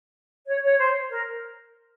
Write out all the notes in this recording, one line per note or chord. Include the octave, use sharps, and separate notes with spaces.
C#5
C#5
C5
A#4